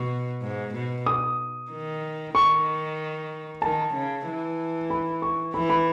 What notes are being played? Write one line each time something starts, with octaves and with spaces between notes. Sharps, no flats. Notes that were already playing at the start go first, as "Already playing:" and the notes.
Already playing: B2 C#6
G#2
B2
D#6
D#3
D#3 C#6
D#3 A5
C#3
E3
B5
C#6
E3 B5
B5